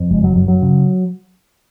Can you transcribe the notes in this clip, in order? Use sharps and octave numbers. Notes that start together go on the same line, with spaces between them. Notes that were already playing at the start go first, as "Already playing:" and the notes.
Already playing: F2
F#1 G#3
F#3
F#2 F#3
F#3
C#3